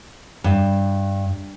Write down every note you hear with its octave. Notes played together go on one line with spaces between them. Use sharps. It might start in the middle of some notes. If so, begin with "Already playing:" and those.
G2